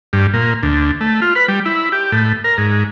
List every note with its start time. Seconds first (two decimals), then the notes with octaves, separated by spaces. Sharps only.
0.13 G2
0.34 A#2
0.63 D2
1.01 A3
1.22 F4
1.36 B4
1.48 G3
1.65 E4
1.92 G4
2.12 A2
2.44 A#4
2.58 G#2